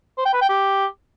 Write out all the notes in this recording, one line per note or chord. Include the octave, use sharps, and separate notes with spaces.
C5
G5
B4
G5
G4